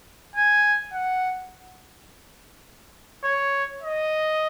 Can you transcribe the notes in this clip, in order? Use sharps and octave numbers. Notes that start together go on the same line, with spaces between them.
G#5
F#5
C#5
D#5